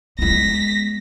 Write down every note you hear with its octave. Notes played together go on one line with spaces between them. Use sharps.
G#3 B3 A#6 B6